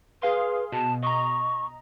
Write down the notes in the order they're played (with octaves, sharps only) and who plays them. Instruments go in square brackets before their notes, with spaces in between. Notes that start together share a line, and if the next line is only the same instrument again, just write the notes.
[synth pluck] G#4 F5 C6 [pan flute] B4
[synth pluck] B2 [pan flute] A5
[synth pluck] D#5 A#5 [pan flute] C#6